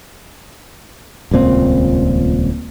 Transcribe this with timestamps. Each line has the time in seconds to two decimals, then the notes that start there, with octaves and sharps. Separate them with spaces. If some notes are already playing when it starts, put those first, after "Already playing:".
1.31 D#1 C#2 A#2 C4